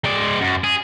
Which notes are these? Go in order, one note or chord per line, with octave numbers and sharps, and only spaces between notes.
G#3 D5
F#2
G#4